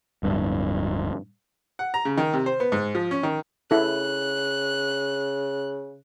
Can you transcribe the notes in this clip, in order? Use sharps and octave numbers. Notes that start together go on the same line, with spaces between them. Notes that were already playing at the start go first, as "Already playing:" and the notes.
D1 G2
F#5
A#5
C#3
D#3
C3
C5
B3
G#2
F3
C#4
D#3
C#3 E4 A4 F#6